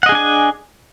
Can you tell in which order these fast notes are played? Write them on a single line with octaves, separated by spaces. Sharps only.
F#5 D#5 G#4 D4 G#5